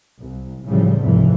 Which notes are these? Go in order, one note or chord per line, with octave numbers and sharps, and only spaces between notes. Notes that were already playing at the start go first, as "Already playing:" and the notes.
C2
A2 C#3 E3 F3 G3
F1 C#2 G#2 E3